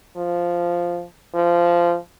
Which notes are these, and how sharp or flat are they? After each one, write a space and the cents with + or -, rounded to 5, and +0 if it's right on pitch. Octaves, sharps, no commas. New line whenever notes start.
F3 -5
F3 -15